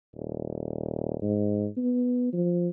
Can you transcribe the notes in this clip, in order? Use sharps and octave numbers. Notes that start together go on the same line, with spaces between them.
D#1
G#2
B3
F3